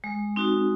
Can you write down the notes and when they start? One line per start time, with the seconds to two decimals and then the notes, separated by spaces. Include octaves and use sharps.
0.04 G#3
0.36 C4 D#4 F#4